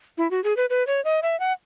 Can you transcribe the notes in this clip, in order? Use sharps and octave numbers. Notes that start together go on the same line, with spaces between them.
E4
F#4
G#4
B4
B4
C#5
D#5
E5
F#5